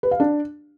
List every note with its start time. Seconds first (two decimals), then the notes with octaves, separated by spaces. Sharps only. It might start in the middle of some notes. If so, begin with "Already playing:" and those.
0.03 B4
0.11 F5
0.20 D4